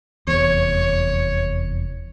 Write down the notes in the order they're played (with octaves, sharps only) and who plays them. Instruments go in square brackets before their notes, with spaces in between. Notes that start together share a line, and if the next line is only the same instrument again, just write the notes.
[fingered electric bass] F1 E2 [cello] C#5